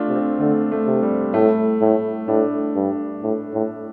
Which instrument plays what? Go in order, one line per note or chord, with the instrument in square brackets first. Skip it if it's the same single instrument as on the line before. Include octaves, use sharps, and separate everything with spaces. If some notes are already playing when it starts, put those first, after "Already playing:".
Already playing: [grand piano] A3 D4 F4
[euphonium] C3
[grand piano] C4
[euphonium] D3 [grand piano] A3
[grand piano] A3
[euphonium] C3
[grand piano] G3
[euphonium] A2 [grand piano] A3
[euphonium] A2
[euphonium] A2 [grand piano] D4
[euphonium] G2
A2
A2